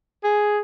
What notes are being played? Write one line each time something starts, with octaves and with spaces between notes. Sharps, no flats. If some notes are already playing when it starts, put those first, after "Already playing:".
G#4